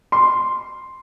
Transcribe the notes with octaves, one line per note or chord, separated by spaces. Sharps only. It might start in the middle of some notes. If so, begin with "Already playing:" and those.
C6